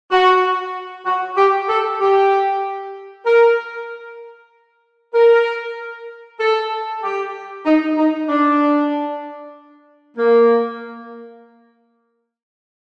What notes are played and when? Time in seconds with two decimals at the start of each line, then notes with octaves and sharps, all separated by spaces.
0.11 F#4
1.06 F#4
1.37 G4
1.69 A4
2.00 G4
3.26 A#4
5.14 A#4
6.40 A4
7.03 G4
7.66 D#4
7.97 D#4
8.29 D4
10.17 A#3